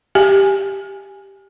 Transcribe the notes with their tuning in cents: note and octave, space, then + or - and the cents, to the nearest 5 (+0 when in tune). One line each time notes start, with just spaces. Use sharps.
G4 +0 G#5 -5